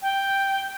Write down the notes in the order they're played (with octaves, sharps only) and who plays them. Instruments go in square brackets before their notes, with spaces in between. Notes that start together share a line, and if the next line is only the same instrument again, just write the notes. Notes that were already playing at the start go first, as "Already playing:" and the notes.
[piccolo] G5